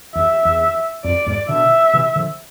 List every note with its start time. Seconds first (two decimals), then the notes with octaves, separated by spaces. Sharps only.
0.15 E2 E5
0.45 E2
1.04 F2 D5
1.26 E2 G#2
1.49 B2 D3 E5
1.94 C3 E3
2.16 D3 F3